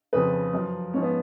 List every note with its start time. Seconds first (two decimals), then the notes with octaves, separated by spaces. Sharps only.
0.13 F2 C#3 F3 B4
0.53 F#2 F3
0.94 G#2 F3 C#4
1.03 B3